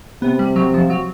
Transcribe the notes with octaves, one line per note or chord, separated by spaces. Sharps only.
C3 B3
G3
F#3
F3
F#3